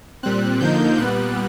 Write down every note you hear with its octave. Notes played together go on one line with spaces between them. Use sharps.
A#2 G3 C4 F#6
D3 F3 A#3 D#4 G6
A#2 G3 B3 F#6